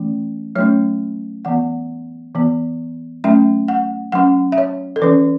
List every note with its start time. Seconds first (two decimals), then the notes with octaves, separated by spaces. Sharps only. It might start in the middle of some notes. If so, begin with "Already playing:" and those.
Already playing: E3 A3 C#4
0.55 F#3 A3 C#4 C#5
1.45 E3 B3 F#5
2.35 E3 B3
3.24 F#3 A3 C#4 E5
3.68 F#5
4.12 F#3 C#4 F#5
4.52 E5
4.58 C#5
4.96 A4
5.02 E3 C#4 B4